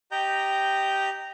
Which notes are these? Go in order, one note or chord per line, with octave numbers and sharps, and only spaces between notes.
G4 D#5 G5 A#5 G6